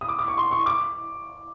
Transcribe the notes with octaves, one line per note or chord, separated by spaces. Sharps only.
D#6
D6
D6
C#6
C6
C#6
D6